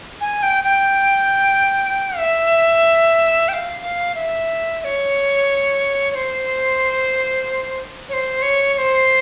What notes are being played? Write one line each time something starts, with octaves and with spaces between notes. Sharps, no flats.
G#5
G5
G5
E5
G5
F5
F5
E5
E5
C#5
C#5
C5
C#5
C5
C#5
C#5
C5